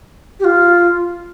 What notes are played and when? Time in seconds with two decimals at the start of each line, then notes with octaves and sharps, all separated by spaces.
0.40 G4
0.45 F4